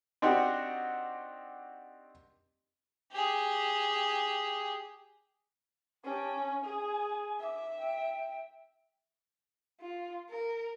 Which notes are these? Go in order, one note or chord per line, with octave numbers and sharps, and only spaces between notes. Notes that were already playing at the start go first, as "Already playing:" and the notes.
C4 D4 D#4 F#4 G4
G4 G#4
C#4 G4 G5 A5
G#5
G#4
E5 D6
G5
F4
A#4